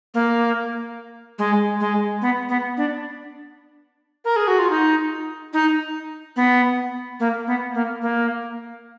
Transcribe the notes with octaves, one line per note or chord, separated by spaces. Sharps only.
A#3
G#3
G#3
B3
B3
D4
A#4
G#4
F#4
F4
D#4
D#4
B3
A#3
B3
A#3
A#3